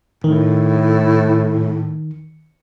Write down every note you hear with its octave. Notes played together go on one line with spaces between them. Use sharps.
A2 D#3